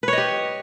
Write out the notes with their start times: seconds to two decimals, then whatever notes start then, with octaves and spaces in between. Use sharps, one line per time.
0.03 B4
0.08 C#5
0.13 D#5
0.18 G4